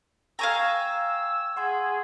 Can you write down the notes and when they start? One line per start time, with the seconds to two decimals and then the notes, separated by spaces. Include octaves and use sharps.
0.39 F5 G5 G#5 A#5 C#6 E6 G#6
1.57 G#4 F#5 C6 G#6